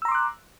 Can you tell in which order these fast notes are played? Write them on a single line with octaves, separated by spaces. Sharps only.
E6 A#5 C6 D6 F#6